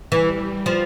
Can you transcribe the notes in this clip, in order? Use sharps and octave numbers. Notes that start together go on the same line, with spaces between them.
E3 G3
F3